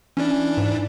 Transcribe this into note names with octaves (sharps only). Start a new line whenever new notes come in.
E3 C#4 D4
G#2